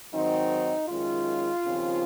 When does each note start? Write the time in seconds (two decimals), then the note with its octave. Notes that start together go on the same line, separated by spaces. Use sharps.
0.12 G#2 D#3 F#3 C4 D#4
0.87 F#2 D#3 G#3 C#4 F4
1.64 D#2 C#3 F3 C4